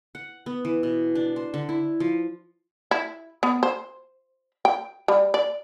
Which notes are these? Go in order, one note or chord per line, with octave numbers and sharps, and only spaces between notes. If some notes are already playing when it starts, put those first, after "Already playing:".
F#5
B3
E3
B2
D4
C5
D3
E4
F3
E4
B3
C5
G5
G3
D5